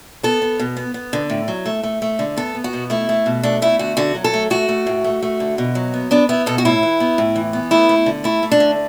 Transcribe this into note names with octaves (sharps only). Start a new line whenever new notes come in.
B3 A4
B3
B2
B3
B3
D3
A2
F#3
A3
A3
A3
D3
B3 A4
B3
F#4
B2
A3 E4
A3
B2
A3 D4
A3 E4
D3 F#4
D3 F#4
F#3
A4
A3
A3 F#4
A3
A2
A3
A3
D3
B2
F#3
B3
B3 D4
B3 E4
B2 A4
F#4
A2 E4
E3
B3
A2
E3
B3
A3 E4
A3
D3
A3 E4
A3
D4
D3